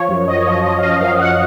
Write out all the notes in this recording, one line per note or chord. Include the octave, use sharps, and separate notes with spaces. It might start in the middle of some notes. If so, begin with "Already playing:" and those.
Already playing: F3 C#5
F#2
F#2 D#5
C#5
F3 D#5
F3 D#5
F5
F3 D#5
F#2 F5
F#2 F#5